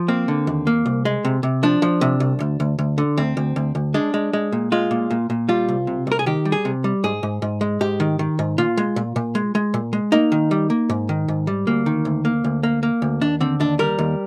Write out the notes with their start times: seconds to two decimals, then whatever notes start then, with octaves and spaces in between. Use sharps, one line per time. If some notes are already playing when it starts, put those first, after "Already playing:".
Already playing: F3
0.08 A#3 C4
0.28 D3
0.47 D#2
0.67 A#3
0.86 C2
1.05 G#3
1.25 C3
1.43 C3
1.63 F3 D4
1.82 F3
2.01 C3
2.20 C2
2.40 D2
2.60 D2
2.79 D2
2.98 D3
3.17 D2 C4
3.37 D2
3.56 D2
3.75 D2
3.94 G#3 D4
4.14 G#3
4.33 G#3
4.52 A#2
4.72 G#3 F4
4.91 A#2
5.11 A#2
5.30 A#2
5.49 G3 F4
5.69 C2
5.87 C3
6.07 C2 A#4
6.19 G#4
6.26 D#3 G4
6.45 G3
6.52 G#4
6.65 C3
6.84 G3
7.04 G#2 G#4
7.23 G#2
7.42 G#2
7.61 G#3
7.81 G#2 G4
8.00 D#3
8.19 D#3
8.39 G#2
8.58 A#2 F4
8.77 G#3
8.96 A#2
9.16 A#2
9.35 G#3
9.55 G#3
9.74 A#2
9.93 G#3
10.12 A#3 D#4
10.32 D#3
10.51 G3
10.70 A#3
10.90 G#2
11.09 D#3
11.28 G#2
11.47 G3
11.67 D2 A#3
11.86 D#3
12.05 D2
12.25 A#3
12.44 D2
12.63 A#3
12.83 A#3
13.02 D2
13.21 D#2 D4
13.41 D3 C4
13.60 D#2 D4
13.79 G3 A#4
13.99 D#2